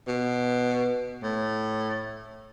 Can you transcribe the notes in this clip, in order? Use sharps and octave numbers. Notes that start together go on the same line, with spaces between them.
B2
A2